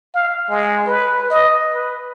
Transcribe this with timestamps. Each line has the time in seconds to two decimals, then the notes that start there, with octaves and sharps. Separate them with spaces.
0.14 F5
0.50 G#3
0.87 B4
1.30 D#5
1.74 B4